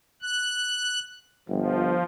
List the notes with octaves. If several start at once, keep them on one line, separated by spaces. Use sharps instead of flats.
F#6
G1 F3